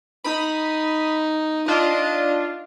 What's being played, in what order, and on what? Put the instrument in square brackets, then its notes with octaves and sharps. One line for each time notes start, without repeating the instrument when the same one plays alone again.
[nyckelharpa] D#4 [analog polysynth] B5 D#6
[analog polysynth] D4 F4 [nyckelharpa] D#5